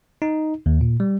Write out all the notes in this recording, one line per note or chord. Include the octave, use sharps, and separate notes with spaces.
D#4
D#2
A#2
G3